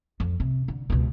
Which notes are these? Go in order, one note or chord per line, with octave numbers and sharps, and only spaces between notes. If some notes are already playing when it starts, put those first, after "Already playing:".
F2
C3
D3
C#2 B2